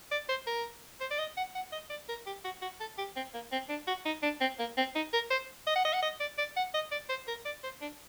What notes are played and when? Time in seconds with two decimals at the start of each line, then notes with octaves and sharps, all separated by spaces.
0.11 D5
0.29 C5
0.47 A#4
1.00 C5
1.11 D5
1.19 D#5
1.37 F#5
1.55 F#5
1.72 D#5
1.90 D5
2.09 A#4
2.26 G4
2.44 F#4
2.62 F#4
2.80 A4
2.98 G4
3.16 C4
3.34 A#3
3.52 C4
3.69 D4
3.87 F#4
4.06 D#4
4.23 D4
4.41 C4
4.59 A#3
4.78 C4
4.95 D#4
5.13 A#4
5.31 C5
5.67 D#5
5.76 F#5
5.85 D#5
5.93 F#5
6.03 D#5
6.20 D5
6.38 D5
6.56 F#5
6.74 D#5
6.92 D5
7.09 C5
7.28 A#4
7.45 D5
7.64 C5
7.81 D4